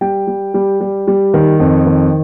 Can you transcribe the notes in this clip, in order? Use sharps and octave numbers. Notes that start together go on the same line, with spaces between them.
G3 G5
G3
G3
G3
G3
D#3
F2
D#3